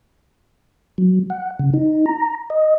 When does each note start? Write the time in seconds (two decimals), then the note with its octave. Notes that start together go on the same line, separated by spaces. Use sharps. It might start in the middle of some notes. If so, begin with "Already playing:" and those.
0.98 F#3
1.30 F#5
1.59 C#3
1.74 D#4
2.06 A#5
2.50 D#5